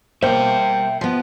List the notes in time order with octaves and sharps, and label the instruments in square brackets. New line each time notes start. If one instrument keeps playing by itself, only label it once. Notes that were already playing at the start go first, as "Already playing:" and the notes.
[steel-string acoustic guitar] G3 A#3 [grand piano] C5 [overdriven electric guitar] E5 G5
[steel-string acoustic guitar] F3 B3